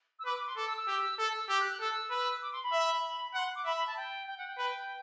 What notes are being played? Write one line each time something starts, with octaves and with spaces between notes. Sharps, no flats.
E6
B4 D6
D6
C6
A4 D6
E6
E6
G4
A4 E6
G4 E6
F#6
F#6
A4 E6
B4
D6
C6
B5
E5
F#5 C6
D6
E5 B5
B5
A5
G5
G5
F#5
G5
B4